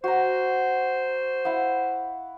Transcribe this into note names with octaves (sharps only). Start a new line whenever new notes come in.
F#4 C5 A#5
E4 F5 F#5